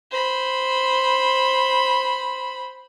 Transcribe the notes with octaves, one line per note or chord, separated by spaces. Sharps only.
C5 B5